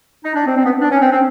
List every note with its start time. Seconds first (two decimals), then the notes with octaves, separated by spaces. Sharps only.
0.24 D#4
0.35 D4
0.46 C4
0.57 C4
0.65 B3
0.81 D4
0.90 C#4
1.01 C4
1.12 C4